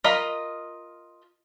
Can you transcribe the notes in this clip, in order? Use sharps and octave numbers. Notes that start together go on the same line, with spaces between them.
F4 A#4 D#5 B5